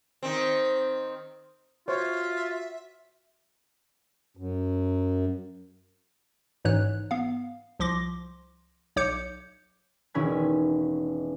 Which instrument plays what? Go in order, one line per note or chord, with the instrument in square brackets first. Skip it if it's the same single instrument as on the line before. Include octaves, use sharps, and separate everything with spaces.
[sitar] D#3 C4
[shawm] F4 [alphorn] F#4 [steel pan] C5 C#5 [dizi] E5
[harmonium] F#2
[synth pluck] A1 G#2 E3 C#5 F#6
B3 F5
C2 F3 C6 D6 A#6
B1 C#5 D6 G6 C#7
[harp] E1 D#3 C#4 E4 B5 G#6